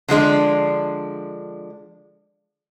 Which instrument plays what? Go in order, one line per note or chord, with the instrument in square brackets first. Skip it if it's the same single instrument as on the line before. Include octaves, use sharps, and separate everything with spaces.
[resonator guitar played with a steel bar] D3 F3 G#3 D4